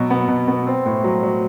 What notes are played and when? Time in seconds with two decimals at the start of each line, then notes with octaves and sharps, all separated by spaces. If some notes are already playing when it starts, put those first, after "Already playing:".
Already playing: B2 F#3
0.10 B3
0.28 B2
0.47 B3
0.67 C4
0.85 A2
1.04 F#3
1.23 F#3